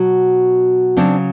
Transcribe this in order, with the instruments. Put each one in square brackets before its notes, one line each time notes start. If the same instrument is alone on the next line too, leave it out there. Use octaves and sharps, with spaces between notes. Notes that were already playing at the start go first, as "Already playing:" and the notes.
Already playing: [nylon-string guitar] B2 F#3 F#4
C#3 F#3 C4 D4